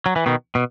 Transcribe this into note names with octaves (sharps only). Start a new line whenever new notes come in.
F#3
E3
B2 D#3
B2